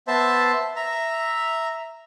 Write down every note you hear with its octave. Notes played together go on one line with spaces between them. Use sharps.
B3 C5 E5 A5
E5 A#5